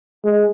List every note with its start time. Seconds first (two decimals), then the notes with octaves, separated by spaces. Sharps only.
0.25 G#3